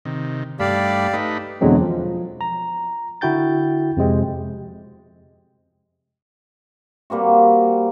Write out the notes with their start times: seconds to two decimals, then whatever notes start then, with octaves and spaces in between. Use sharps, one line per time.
0.05 C3 D#3
0.60 G2 A3 G4 D5 F5 B5
1.13 A3 D#4 B4
1.61 E2 B2 D3 F#3 G#3 C4
1.81 F3
2.41 A#5
3.21 D3 E4 F#4 G5 G6 A6
3.97 F2 C3 G#3 C4
7.10 G3 A#3 C4 F#4